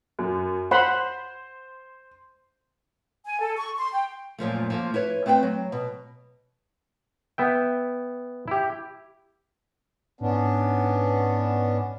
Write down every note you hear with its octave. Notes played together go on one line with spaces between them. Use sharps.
F#2
C5 F#5 B5 C6
G#5
A4
C#6
C6
G5
F#2 A#2 F3 A3
F3 A3 A#3
E4 B4 C#5
A3 C4 B4 D5 G5
F#3
B2
B3 E5 G5
E4 G4
G#2 B3 C#4 D4